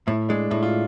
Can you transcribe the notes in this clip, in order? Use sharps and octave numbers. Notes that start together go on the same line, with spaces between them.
A2 E4
G#3 D4
A2 E4
F4